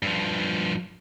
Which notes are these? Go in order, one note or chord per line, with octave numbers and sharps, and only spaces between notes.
G2 F3